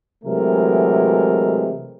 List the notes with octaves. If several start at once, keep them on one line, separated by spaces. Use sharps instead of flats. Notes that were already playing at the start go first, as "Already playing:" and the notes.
C3 E3 F#3 G#3 A3 A#4